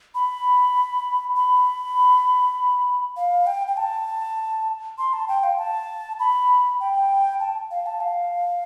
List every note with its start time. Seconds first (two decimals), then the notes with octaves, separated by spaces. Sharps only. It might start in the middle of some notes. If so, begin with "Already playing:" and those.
0.15 B5
1.36 B5
3.17 F5
3.47 G5
3.67 G5
3.77 A5
4.98 C6
5.13 A5
5.28 G5
5.44 F5
5.59 A5
6.19 B5
6.80 G5
7.40 A5
7.71 F5
7.86 A5
8.01 F5